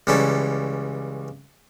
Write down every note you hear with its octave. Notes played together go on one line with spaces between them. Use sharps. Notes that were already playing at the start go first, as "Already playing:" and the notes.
C#2 E3 G3 C#4 A4